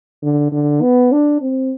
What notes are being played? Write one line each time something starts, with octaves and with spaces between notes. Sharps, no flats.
D3
D3
B3
D4
C4